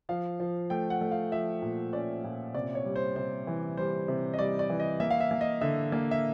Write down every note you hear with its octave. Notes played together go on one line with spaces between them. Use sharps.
F3 F5
F3
A3 G5
F#5
A3
F5
F3 E5
A#2
C#4 D5
A#2
C3 D5
C#5
G3
C5
C3 C5
E3
G3 C5
C3
D#5
G3 D5
D5
E3
D#5
A#3 E5
F5
E5
A#3
D#5
D3 E5
A#3
E5